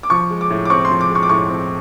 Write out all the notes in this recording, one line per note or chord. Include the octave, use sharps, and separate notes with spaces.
D6
F3 C#6
G#3
D6
A2
D6
C4 C#6
C6
F3
D6
G#3
C#6
D6
A2 C#6
C4